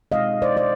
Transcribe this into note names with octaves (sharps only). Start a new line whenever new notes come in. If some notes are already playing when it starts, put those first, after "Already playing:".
B2 G#3 C4 D#4 D#5 F5
C5 D5
C5 D5